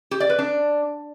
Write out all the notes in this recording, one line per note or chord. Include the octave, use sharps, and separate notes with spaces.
G4
D5
B4
D4